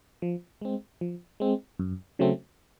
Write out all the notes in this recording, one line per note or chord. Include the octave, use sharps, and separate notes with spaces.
F3
G#3 C4
F3
G#3 C4
F#2
C#3 F#3 A3 C4